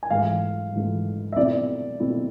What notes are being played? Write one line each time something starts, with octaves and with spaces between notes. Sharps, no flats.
G#5
G#2 E3 A3 F5
G#2 E3 A3
E5
B2 A3 C4 E4 D5
B2 A3 C4 E4